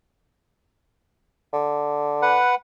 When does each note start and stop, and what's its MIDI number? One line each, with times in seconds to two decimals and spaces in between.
1.53 2.38 50
2.22 2.55 71
2.22 2.55 78